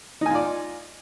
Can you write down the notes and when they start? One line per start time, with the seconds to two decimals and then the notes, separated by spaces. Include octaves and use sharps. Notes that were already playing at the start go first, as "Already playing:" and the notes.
0.21 D#4
0.26 G#5
0.30 F4
0.35 D5